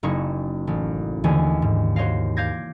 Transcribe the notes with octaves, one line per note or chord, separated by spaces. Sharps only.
F#1 A#3 D#4 E4 G#4 C#6
A1
D#2 D3 E3 A3 G#4 G#5
G#2
F#4 C5 C#5 D#5 F5
F5 D6 G6 G#6 A#6